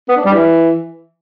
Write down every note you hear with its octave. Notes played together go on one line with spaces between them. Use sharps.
B3
D4
G3
E3